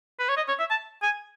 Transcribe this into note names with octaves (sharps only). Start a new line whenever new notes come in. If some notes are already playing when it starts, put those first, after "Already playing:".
B4
C#5
D#5
C#5
E5
A5
G#5